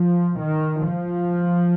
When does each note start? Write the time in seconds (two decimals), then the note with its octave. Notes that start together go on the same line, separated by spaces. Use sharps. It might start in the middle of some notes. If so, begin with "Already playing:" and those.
Already playing: F3
0.40 D#3
0.89 F3